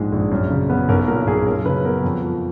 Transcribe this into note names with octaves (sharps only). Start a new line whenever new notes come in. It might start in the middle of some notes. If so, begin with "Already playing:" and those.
Already playing: A#1 G#2 G#3 G#4
A#1
F#2
C#3
B3
B1 A#4
A#2 A#4
B1 G#4
F#2 A#4
C#3 B4
B3 A#4
F2
F3